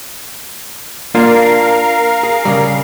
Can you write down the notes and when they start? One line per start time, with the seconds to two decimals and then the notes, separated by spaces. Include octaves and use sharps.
1.15 A#3 D4 F4 A#4 F5
2.23 G#4
2.45 C#3 G3